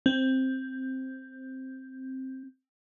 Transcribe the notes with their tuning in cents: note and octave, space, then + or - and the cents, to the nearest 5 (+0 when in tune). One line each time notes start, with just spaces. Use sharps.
C4 +5